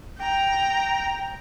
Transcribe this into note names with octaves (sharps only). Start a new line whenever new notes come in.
G5 A#5